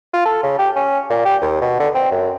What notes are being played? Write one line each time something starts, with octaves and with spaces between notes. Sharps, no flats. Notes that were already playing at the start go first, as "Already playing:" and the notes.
F4
A4
C#3
G4
C#4
A#2
G4
D#2
B2
D3
C4
F#2